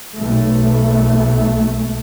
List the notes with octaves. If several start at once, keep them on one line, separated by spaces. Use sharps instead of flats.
B1 A3